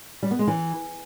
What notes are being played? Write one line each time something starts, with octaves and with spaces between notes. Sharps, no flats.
G3
B3
G#3
E3